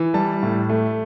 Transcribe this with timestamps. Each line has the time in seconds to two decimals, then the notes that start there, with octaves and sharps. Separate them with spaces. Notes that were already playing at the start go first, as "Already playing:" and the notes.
Already playing: E3
0.14 G3 A5
0.43 A2
0.69 A3